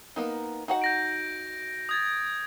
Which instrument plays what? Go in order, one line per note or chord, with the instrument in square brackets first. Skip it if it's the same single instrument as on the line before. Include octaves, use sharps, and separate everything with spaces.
[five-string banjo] A#3 B3 D#4
D#4 F#4 F#5
[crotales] G6 A#6 D7
D#6 G#6 A6